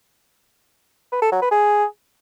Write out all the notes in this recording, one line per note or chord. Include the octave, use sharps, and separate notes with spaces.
B4
A4
F#3
B4
G#4